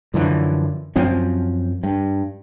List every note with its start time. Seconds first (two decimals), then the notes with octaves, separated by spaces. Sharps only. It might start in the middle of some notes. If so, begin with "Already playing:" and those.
0.14 F#2 D3 E3 F3
0.96 F#2 F3 C4 C#4
1.83 G2